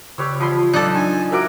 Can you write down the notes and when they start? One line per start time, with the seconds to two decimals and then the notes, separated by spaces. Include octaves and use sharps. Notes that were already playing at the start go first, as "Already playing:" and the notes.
0.18 C#3 G3 C#5 E6 F#6 G6
0.40 E3 F3 B5 C6
0.73 F#3 D#4 A4 D5 F#6
0.95 D4 G#5
1.32 F#4 A#4 E5 F#5 D6